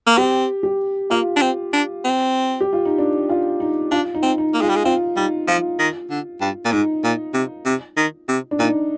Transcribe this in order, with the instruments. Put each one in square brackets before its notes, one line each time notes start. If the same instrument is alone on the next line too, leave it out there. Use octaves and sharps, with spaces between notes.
[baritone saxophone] A#3
[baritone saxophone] C4 [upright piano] G4
[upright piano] G4
[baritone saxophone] A#3 [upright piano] F4
[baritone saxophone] D4
C4
D4
C4
[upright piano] G4
F4
D#4
D4
F4
D#4
[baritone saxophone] D4 [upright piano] F4
[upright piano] D#4
[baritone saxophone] C4
[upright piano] D#4
[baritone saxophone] A#3
[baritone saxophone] G#3 [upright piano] F4
[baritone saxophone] G3
G#3
[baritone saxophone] C4 [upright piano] F4
[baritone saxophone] G3 [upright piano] D#4
[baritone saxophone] F3 [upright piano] F4
[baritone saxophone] D#3
D3
G2
A#2
[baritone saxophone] G#2 [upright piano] D#4
[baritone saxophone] A#2
C3
C3
D#3
C3
[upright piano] D4
[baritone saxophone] A#2 [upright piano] D#4